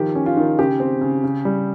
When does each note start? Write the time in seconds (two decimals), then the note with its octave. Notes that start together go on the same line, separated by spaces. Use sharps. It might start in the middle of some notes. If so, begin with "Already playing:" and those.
Already playing: D#3 F3 G4
0.15 C#4
0.26 F4
0.37 D#3
0.59 C#3 G4
0.80 C4
1.01 C#3
1.24 C#3
1.45 G3